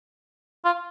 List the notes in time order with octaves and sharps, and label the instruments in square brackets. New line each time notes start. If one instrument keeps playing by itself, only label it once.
[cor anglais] F4